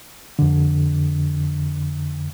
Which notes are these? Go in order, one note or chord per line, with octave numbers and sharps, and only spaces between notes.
F2 D3